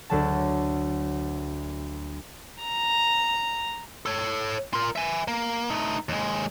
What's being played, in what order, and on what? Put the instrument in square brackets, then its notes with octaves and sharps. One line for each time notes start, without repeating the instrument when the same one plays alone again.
[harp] D2 F#3 A5
[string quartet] A#5
[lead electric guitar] A4 C#5
F4 A#4
E5 G#5
A#3
A3 D#4
D#2 G#3